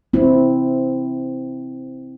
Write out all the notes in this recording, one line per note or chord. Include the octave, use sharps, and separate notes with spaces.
C4 E4